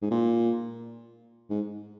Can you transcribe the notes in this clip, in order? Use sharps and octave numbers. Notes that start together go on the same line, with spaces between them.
G#2
A#2
G#2